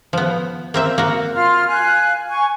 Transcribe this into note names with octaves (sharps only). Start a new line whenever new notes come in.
F3 B3
A#3 C4 E5
A#3 F#4
F4 C6 F6
F5 G#5 F#6
G#5 C#6